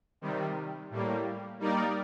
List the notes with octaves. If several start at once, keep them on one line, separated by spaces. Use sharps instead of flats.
C3 D#3 G3
A2 G3 A#3
G3 A#3 D#4 A#4 D5